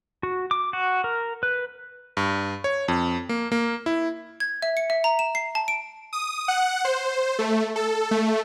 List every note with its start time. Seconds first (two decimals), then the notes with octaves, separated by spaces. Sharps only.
0.23 F#4
0.51 D6
0.73 F#4
1.04 A#4
1.43 B4
2.17 G2
2.64 C#5
2.88 F2
3.29 A#3
3.52 A#3
3.86 E4
4.40 G#6
4.62 E5
4.77 C#7
4.90 E5
5.04 A#5
5.19 E7
5.35 C7
5.55 A5
5.68 D7
6.13 D#6
6.48 F#5
6.85 C5
7.39 A3
7.76 A4
8.11 A3